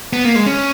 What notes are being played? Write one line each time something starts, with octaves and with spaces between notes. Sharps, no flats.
B3
A#3
G#3
C#4